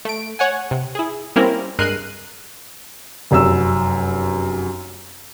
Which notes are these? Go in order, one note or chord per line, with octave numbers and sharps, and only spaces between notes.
A3 D7
C#5 F#5 G#5
C3
E4 G#4
G3 A#3 C4 C#4 E4 A#4
G2 G#3 A#4 F#6 C7 D#7
F1 F#2 E6